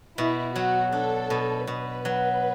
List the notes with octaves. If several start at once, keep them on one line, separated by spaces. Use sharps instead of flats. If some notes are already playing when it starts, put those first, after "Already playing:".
B2 E4
F#3 F#4
D4 A4
B2
B2 B4
F#3